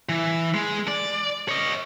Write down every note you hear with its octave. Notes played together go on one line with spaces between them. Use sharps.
E3
G#3
D5
C#5 D#5